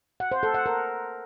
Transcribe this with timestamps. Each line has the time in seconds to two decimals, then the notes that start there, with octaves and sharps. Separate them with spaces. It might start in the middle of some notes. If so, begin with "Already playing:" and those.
0.20 F#5
0.32 C5
0.43 A4
0.54 F#5
0.66 A#4